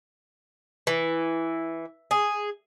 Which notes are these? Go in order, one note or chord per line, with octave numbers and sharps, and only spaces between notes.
E3
G#4